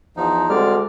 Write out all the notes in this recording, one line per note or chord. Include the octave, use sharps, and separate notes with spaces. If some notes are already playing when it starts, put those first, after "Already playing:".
E2 F3 D#4
D2 D3 G3 G#3 C4 D5 F6